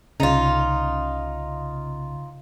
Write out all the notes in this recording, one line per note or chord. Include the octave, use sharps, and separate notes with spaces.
C2 C#3 D#4 F4